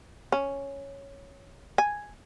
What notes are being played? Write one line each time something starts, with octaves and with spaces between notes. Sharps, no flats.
C#4
G#5